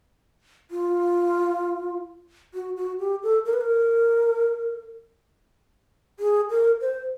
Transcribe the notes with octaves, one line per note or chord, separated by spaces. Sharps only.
F4
F#4
F#4
G4
A4
A#4
B4
A#4
G#4
A#4
C5